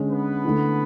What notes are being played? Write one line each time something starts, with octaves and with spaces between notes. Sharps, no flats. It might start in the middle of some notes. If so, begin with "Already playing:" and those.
Already playing: D3 G#3 C#4
B3 B4
D3 A3 E4